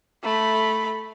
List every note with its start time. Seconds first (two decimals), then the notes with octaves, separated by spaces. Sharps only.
0.23 A3 B5